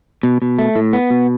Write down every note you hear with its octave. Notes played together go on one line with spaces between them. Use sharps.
B2
B2
A3
A2
B3
B2